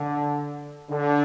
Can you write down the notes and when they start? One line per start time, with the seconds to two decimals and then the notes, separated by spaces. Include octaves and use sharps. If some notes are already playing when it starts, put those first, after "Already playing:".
Already playing: D3
0.91 D3